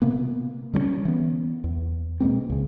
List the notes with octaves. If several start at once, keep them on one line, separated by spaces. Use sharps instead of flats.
C3 A#3 B3
D3 G3 B3 C#4
E3 B3
E2
B2 G#3 A#3 C4
C#2 C#3